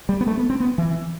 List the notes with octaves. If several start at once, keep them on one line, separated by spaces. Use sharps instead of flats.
G3
B3
A3
B3
C4
B3
E3